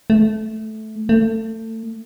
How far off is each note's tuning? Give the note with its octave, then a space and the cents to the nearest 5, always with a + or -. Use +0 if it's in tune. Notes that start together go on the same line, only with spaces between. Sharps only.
A3 -15
A3 +25